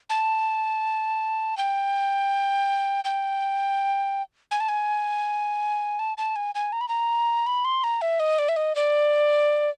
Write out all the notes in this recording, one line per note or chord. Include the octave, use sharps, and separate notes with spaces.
A5
G5
G5
G#5
A5
G#5
A5
A5
G#5
G#5
A#5
B5
A#5
B5
C6
A#5
E5
D#5
D5
E5
D#5
D5